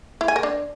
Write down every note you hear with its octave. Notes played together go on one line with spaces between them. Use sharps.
E4
G#5
A#4
D4